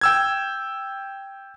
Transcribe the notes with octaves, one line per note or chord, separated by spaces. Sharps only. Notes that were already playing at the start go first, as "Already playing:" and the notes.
G5 E6 G#6